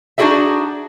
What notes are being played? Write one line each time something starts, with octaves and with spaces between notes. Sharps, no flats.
D4 D#4 F#4 G#4 D5 E5